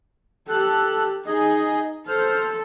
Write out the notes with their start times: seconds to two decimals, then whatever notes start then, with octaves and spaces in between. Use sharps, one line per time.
0.49 G4 A4 F#6
1.27 D#4 G#4 D#5
2.07 A4 C5 F6